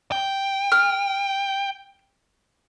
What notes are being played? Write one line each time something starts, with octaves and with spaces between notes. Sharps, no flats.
G5
F6